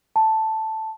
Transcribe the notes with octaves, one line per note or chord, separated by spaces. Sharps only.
A5